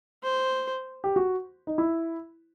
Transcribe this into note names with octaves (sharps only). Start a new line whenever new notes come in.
C5
G4
F#4
D#4
E4